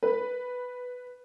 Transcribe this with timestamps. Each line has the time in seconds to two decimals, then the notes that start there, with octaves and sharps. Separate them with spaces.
0.03 B4